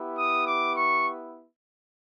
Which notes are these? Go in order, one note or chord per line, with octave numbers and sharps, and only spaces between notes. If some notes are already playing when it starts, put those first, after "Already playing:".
Already playing: B3 E4 G4
D#6
D6
C#6